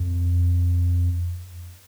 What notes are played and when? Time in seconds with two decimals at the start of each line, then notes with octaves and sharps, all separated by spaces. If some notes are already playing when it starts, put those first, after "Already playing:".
Already playing: F2